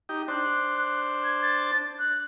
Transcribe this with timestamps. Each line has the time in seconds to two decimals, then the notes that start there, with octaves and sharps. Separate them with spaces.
0.09 D#4 G4
0.28 D4 C5 F#6
1.24 G#6
1.42 A6
1.99 F#6